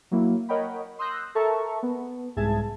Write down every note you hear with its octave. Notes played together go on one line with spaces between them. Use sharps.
F#3 A#3 E4
A#4 C#5 D#5 F#5 G5 B5
C6 D#6 E6 F#6 G6 A#6
A4 A#4 E5 A5 A#5 C#6
B3
C2 G#2 G#4 E5 A5 G#6